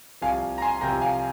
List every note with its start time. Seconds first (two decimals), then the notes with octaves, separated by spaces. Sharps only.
0.21 C2 C3 F3 F5 G#5
0.58 A#5
0.62 G#5 C6
0.81 C2 C3 F3 G5 A#5
1.02 F5 G#5